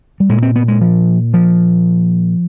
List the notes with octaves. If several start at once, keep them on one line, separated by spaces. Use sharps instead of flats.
G3
A#2 G#3
C4
B3
G#3
F3
F3